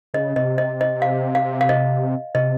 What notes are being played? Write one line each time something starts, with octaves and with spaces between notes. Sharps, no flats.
C#3 D#5
C3 D#5
D#5
D#5
F5
F5
F5
D#5
C3 D#5